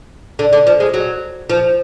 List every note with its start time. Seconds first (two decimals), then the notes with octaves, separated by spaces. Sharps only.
0.39 D3
0.53 D3
0.67 F3
0.80 G#3
0.94 F#3
1.50 F3